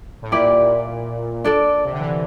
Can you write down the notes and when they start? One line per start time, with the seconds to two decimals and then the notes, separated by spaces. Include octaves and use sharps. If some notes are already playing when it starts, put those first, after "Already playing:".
0.22 A2
0.32 A#2 E4 G4 D5
1.44 D4 A4 D5
1.85 C3
1.92 D3
2.00 E3